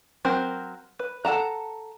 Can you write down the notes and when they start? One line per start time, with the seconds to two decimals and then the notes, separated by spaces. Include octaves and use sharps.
0.25 F#3 C4 A#4 C5
0.99 B4
1.25 A4 F#5 A5 A#5